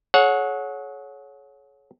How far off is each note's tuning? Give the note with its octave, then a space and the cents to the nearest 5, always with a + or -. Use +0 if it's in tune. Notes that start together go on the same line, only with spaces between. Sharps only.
G#4 +40 C#5 +0 F#5 -15